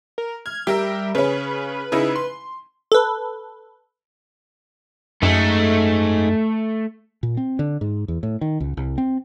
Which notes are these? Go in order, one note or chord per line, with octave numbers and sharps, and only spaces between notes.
A#4
F6 G#6
G3 G4 A#4 E5
C#3 C#4 B4
C#3 D#4 E4
C6
A4 B4
F#2 A3 D#4 G#4
A#2
C4
D3
G#2
E2
A2
D#3
C#2
C2
C4